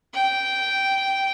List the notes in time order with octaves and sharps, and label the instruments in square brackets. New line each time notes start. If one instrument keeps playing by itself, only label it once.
[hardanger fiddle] G5